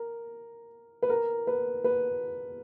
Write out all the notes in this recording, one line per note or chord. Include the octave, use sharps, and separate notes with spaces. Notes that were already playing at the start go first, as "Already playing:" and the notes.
Already playing: A#4
B4
A#4
B4
B4